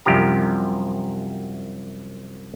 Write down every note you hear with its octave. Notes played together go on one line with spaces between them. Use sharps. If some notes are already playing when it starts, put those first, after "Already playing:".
C2 F#2 C3 F3 G4 A#5